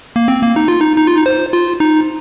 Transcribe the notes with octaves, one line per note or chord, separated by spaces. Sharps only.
A#3
C4
A#3
D#4
F4
D#4
D#4
F4
D#4
C5
F4
D#4